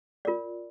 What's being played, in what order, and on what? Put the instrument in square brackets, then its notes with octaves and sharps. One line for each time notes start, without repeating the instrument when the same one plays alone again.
[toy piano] F4 A#4 D5